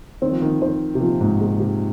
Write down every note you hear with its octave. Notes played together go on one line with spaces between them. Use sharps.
D#3 C4
F3
D#3
D#3 C5
C3
A#2 F3
G#2
A#2 G#4
C3